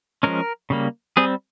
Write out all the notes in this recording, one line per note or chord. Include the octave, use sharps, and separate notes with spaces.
F3 G#3 C#4 A#4
C#3 G3 A#3
G3 C4 G#4